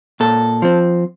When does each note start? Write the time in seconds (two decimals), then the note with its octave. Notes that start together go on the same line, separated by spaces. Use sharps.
0.20 A#2 A4
0.62 F3 C4